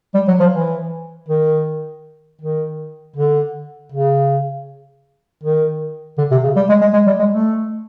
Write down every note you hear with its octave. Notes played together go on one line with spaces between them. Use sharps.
G3
F#3
F3
E3
D#3
D#3
D3
C#3
D#3
D3
C3
C#3
G3
G#3
G#3
G#3
G3
G#3
A3